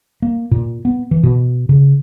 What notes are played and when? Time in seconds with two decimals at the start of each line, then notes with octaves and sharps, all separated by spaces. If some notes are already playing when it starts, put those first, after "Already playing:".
0.22 A#3
0.51 A#2
0.85 B3
1.11 E3
1.23 B2
1.69 C#3